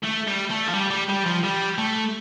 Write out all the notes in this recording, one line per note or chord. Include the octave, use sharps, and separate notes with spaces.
A3
G3
A3
F3
G3
G3
G3
F3
G3
A3